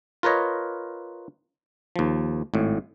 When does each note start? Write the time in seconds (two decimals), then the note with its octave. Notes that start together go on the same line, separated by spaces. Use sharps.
0.23 F4 A#4 B4 C#5 D#5
1.96 D#2 F3
2.54 G#1 A2